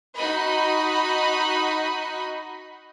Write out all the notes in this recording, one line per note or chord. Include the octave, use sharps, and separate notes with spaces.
D#4 F#4 D#5 B5